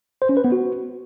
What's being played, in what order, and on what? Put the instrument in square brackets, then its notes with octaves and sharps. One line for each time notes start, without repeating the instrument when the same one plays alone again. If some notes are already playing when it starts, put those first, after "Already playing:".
[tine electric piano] C5
C#4
B4
B3
F#4